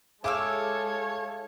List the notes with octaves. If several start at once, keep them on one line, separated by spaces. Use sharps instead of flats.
G#3 E4 G#4 A4 C#5 F5 D6 E6